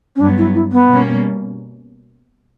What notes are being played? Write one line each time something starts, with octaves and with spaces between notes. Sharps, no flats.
C#4
G2 F#3 B3 D4
E4
E4
B3
B2 G3 A#3 C#4